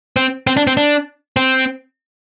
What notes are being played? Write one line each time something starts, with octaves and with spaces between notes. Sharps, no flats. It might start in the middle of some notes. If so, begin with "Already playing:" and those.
C4
C4
D4
C4
D4
C4